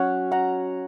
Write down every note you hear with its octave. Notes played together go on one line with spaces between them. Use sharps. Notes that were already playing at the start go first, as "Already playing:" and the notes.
Already playing: F#3 C#4 C#5 F#5
F#5 A#5